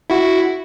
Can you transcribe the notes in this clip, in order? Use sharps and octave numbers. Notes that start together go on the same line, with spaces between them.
E4 F#4